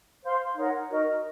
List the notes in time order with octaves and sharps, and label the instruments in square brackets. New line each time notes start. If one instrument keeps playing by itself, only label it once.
[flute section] C5 F5 C6
D#4 A#4 C#5 F#5
D#4 F#4 A#4 D#5